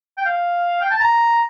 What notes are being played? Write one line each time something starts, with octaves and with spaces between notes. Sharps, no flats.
G5
F5
G5
A5
A#5